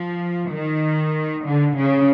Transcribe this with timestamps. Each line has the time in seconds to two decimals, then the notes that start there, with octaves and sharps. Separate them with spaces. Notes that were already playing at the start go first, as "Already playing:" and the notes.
Already playing: F3
0.51 D#3
1.44 D3
1.76 C#3